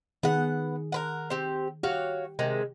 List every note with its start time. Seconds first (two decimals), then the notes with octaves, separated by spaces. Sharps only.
0.23 D#3 B3 G#4 F#5
0.92 A#4 B4 F#5
1.30 C4 G4
1.83 F#4 G4 C#5 F5
2.39 C3 D#3 G#3